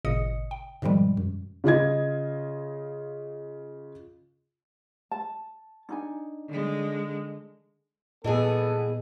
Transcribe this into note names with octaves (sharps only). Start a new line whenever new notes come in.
G#1 A#2 C#3 D#5 D#6 C#7
G5
G#2 B2 D#3 F3 G3 G#3
F#2
C#3 F4 D#5 G#6
A5
D4 D#4 G#5
D3 G#3
A#2 E3 G3 B3 G#4 A4 D#5